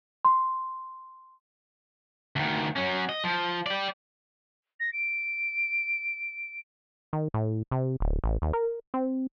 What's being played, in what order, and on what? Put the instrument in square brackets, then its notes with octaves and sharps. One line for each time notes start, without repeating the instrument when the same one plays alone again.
[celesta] C6
[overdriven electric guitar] D2 D#3
F#3 C#4
D#5
F3
G4 D5
[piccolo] A#6
D7
[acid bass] D#3
A2
C3
D1
A1
D#2
A#4
C4